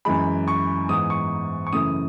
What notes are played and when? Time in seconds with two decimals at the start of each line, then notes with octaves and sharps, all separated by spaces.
0.05 F#2 E3 G#3 B5
0.48 C#6
0.89 G#2 E3 G#3 B3 D#6
1.10 C#6
1.67 C#6
1.73 F#2 C#3 E3 A3 D#6